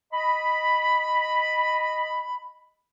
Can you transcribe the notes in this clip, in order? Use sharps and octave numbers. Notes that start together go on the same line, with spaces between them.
D#5 B5